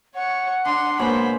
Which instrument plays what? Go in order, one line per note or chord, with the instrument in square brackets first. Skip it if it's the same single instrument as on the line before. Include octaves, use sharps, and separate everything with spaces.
[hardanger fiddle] C#5 C#6 [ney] F#5
[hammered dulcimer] D4 [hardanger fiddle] C6
[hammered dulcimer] B2 G#3 C#5 [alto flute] A#3 [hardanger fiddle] C5 B5